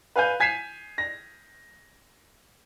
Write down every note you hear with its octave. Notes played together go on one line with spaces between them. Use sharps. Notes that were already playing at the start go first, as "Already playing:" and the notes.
B4 F5 G#5 G6
G#5 G#6 B6 C7 D#7 E7
A#6